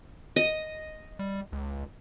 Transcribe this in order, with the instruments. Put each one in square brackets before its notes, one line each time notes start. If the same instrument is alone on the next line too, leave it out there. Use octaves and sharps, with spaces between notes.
[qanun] D#5
[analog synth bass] G3
C#2